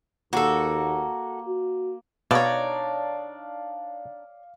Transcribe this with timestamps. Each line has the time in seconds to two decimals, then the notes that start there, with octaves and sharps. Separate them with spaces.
0.33 D#2 A#3 F#4 A4
1.47 F#4
2.31 B2 D4 D#4 C#5 D5 F5 A#5